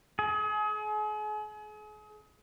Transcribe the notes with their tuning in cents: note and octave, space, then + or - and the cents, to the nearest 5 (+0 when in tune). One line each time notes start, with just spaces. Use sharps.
G#4 +35